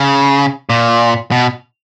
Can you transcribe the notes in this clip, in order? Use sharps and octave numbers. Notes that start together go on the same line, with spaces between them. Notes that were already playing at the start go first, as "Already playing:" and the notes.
Already playing: C#3
A#2
B2